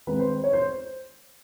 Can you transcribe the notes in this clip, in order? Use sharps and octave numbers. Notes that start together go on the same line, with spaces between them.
D#3 G#3 C4 B4
C5
C#5
C5